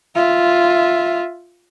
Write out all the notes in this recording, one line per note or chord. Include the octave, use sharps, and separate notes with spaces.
F4 E5